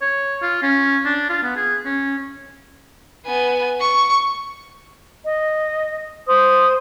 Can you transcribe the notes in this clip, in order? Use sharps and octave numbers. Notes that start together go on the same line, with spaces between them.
C#5
F4
C#4
D4
F4
B3
G#4
C#4
B3 G#5
C#6
D#5
C5 D#6